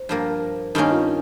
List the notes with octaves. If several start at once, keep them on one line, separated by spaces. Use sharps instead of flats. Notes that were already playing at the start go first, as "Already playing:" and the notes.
Already playing: C5
G2 F3 A#3
G2 D#3 A#3 C#4 D#4
F4